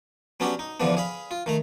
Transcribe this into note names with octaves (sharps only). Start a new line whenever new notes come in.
F#3 B3 C#4 D4 F#4 G4
D#4
E2 D3 E3 F3 B3 D4
G#4 F5 B5
F4
D#3 A3 A#5